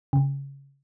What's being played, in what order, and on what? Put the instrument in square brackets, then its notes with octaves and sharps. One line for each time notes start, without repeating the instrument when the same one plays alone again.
[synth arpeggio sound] C#3